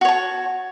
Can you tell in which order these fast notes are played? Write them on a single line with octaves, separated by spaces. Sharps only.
F#4 C#5 A5